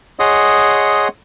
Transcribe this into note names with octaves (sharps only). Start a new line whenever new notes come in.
G#4 C#5 D#5 F#5 C6 D#6